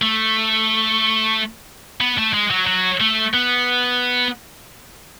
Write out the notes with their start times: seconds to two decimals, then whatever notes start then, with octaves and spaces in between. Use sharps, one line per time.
0.02 A3
2.01 B3
2.18 A3
2.34 G#3
2.51 F#3
2.67 F#3
3.00 A3
3.34 B3